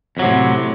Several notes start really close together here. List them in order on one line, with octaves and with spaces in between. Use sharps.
F2 F#3 C3 A2